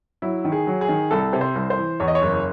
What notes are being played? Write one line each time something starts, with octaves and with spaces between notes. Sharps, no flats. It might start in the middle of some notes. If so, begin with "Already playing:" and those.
F#3 E4
D#3
G#4
F#3
G#4
D#3
C2 A4
C3
C5
C2
C5
E3
E2 C#5
D#5
C#5
F#1